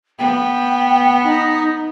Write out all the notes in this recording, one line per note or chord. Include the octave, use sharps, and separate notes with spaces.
B3 G5
D#4